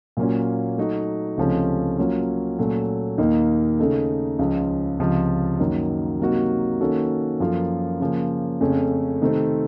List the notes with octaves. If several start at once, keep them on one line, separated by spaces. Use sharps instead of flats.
A#2 F#3 A#3 C#4 F4
F#3 A3 D#4 F#4
C#2 C3 F3 A3 C#4
F#3 A#3 C#4 F4
A#2 F#3 A3 C#4
D#2 D#3 A#3 D#4
C#3 A3 D#4 A4
C#2 C#3 F3
C#2 C3 F3
F#2 D#3 F#3 A#3
C3 F#3 A#3 D#4 F#4
D#3 A#3 C#4 F#4 A4
F#2 F3 A#3 F4 A4
C#3 F3 A#3
F2 C#3 A3 C#4
C3 D#3 A3 C4